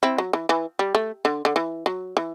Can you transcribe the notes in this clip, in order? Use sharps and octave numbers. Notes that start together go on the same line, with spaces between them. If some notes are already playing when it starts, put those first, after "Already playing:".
C4 E4
F#3
E3
E3
G3
A3
D3
D3
E3
F#3
E3